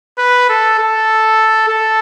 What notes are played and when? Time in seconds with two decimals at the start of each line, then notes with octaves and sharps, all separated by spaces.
0.18 B4
0.49 A4
0.78 A4
1.68 A4